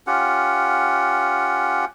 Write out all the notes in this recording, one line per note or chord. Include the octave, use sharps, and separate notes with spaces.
C#4 F4 G4 F#5